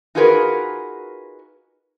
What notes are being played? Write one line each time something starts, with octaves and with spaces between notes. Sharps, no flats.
D#4 F4 F#4 G#4 A#4 B4